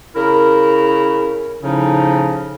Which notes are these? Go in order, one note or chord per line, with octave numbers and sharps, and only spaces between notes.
C#3 E4 A#4
A2 C#3 F3 C#4 D#4